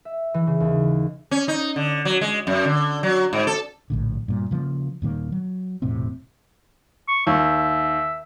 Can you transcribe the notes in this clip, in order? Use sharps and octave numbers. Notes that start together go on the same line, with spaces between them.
E5
E3
C#3
D#2
C#4
D#4
D3
F#3
G#3
F#2
D3
F#3
G#2
A4
A#1 A2 D3
G2 A#2
C#3 F3 F#3 A#3
D#1 A#2 D#3 A#3
F#3
E1 A2 C3 C4
C#6
D#2 E5